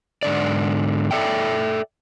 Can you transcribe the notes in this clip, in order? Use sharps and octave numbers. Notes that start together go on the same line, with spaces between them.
G#2 D3 D5
A4 D5 E5 G5